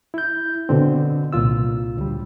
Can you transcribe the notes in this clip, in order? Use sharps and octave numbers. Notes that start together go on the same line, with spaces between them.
E4 G6
B2 D3 C4
C2 A#2 F4 E6
D2 G3